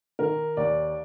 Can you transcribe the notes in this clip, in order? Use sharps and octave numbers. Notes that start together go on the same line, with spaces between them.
D#3 A#4
D#2 D5